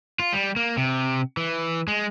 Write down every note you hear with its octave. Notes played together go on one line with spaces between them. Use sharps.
F4
G3
A#3
C3
E3
G#3